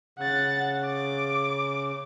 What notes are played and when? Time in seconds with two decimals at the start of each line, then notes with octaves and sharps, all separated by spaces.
0.19 C#3 F#5 A6
0.86 D6